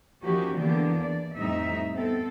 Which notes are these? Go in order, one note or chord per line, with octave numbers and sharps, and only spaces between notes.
F3 A#3 C#4 D#4 F#4 G4
D3 E3 A#3 B3 D4 G4
E2 D5
F2 A2 G3 C4 D#4 E5
B3 C4 A4